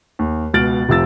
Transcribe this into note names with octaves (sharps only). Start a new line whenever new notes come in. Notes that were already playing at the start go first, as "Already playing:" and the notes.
D#2
C#2 B2 F6 A6 D7 F#7
F1 C3 F3 E6 A6